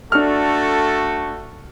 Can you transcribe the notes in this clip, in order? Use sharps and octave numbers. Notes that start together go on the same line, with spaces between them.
A3 D4 F#4 A4 F6